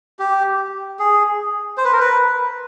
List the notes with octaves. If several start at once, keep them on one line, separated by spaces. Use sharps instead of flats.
G4
G#4
C5
B4
A#4
B4